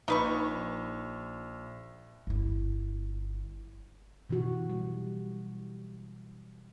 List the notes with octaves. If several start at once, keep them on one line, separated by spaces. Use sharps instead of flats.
A#1 D#4 B4 C#6
G1 E4
B2 E3 F#3 F#4
G3